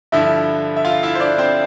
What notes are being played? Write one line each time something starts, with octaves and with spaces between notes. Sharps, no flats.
G2 D3 F3 E4 E5
E5
F4 F5
E4 E5
C5
D4 D5
C4 C5